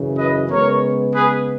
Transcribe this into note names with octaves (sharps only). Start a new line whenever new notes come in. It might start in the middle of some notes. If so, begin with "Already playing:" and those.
Already playing: F#2 C#3 E3
B4 D#5
C#3 G#3 B3 A#4 C#5
G#4 B4